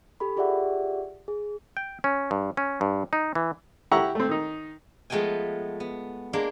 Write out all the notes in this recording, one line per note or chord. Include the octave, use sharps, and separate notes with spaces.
G4 A4 B5
F4 G4 G#4 D5 E5 F#5
G#4
G5
C#4
G2
C#4
G2
D#4
E3
E4 G4 F#5 G5 A#5 C#6
A3 C4
D#3 D#4
F3 G#3 A3 B3 G5 G#5
B3
G#3 A#3 D4